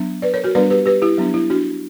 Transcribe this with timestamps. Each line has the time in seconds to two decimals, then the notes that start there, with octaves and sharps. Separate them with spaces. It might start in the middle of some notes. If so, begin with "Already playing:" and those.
Already playing: F#3 B3 D4
0.22 B4 D5
0.34 A#4 C#5
0.44 F#4 A#4
0.55 G3 B3 D4 B4 D5
0.70 G4 B4
0.86 G4 B4
1.02 E4 G4
1.18 F#3 B3 D4
1.34 E4
1.50 D4 F#4